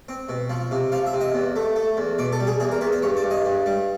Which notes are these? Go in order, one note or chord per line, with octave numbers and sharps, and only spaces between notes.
C4
B2
F3
C3
F3 F5
E5
C3
D#5
E2
A3
A3
E2
B2 D5
A4
G3
G#4
E2 G#4
A#4
E2 B4
C5
G2 C#5
D5
G2
D#5
G2
G3